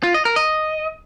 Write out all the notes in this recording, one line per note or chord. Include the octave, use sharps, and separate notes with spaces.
F4
D#5
A#4
D#5